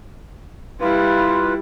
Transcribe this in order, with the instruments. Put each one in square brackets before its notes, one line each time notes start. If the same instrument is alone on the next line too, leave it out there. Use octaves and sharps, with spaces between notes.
[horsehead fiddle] G3 E4 [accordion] F4 B4